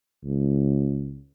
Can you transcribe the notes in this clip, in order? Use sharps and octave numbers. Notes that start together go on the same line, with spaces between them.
C#2